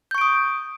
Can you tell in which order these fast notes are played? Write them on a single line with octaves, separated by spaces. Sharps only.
G6 C#6 D7 D#6